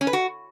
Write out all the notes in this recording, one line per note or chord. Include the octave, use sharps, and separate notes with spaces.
C#4
B4
F#4